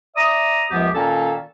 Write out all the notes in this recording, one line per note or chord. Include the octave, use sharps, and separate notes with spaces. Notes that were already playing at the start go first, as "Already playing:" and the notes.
D5 E5 A#5 D#6
C#2 F#2 F3 B3 G4
A#2 D#3 A#3 C#4 A4 A5